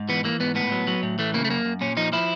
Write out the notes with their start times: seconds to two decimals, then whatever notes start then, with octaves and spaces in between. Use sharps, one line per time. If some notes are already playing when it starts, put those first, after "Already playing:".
Already playing: G#2
0.09 E3 B3
0.24 E3 A#3
0.40 G#2 B3
0.55 A2 B3
0.72 F#3
0.87 F#3
1.03 A2
1.19 E3 A3
1.34 C#3 A#3
1.45 A3
1.50 F#2 A#3
1.65 F#2
1.81 A#2 C#4
1.97 F3 D#4
2.13 F3 E4